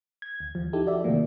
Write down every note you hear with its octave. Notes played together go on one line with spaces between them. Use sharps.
G#6
D2
D#2 F3
D#4 E4 G4 A4
F#4 D5 E5
C3 D#3 F3 A3 A#3